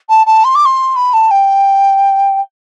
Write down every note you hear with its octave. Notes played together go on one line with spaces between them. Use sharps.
A5
A5
C6
D6
C6
B5
A5
G5